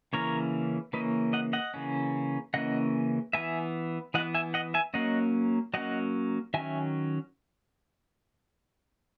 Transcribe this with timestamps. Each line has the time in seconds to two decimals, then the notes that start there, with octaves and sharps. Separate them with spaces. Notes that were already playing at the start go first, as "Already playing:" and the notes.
0.13 C#3 E3 A#3 C#4 A#4 C#5
0.93 C#3 E3 A#3 C#4 B4 D#5
1.33 D#5 F#5
1.53 D#5 F#5
1.74 C#3 E3 A#3 C#4
2.54 C#3 E3 A#3 C#4 D#5 F#5
3.33 E3 B3 E5 G#5
4.14 E3 D#5 F#5
4.18 B3
4.34 E5 G#5
4.54 D#5 F#5
4.74 E5 G#5
4.94 F#3 A#3 C#4 D#5 F#5
5.74 F#3 A#3 C#4 D#5 F#5
6.54 D#3 F#3 C#4 E5 G#5